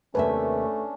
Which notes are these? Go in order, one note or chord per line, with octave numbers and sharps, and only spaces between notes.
D#2 C3 A3 C#4 D4 B4 E5